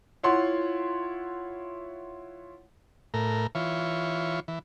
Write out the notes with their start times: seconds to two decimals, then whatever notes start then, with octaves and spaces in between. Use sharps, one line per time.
0.23 E4 F4 C#5 F#5 C6
3.14 A2 A#4
3.55 E3 F4 C#5
4.48 E3